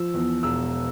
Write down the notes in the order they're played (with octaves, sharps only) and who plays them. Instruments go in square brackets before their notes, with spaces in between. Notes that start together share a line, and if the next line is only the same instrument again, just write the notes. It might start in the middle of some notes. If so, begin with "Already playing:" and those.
Already playing: [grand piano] F3 E6
E2
E1 E6